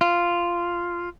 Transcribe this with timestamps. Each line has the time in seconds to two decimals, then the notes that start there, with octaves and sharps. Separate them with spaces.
0.01 F4